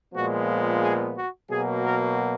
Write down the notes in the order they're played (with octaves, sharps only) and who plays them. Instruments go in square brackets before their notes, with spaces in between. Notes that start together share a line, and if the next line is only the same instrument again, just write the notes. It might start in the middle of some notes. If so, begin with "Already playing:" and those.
[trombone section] A#2 F3 G#3 B3 F#4
G#4
F#4
B2 F#3 A#3 G#4
A#4